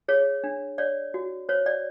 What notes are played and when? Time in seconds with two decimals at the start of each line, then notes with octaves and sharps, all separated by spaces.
0.08 G#4 C#5
0.44 D4
0.78 C#5 D5
1.14 F#4
1.49 C5 C#5
1.66 D5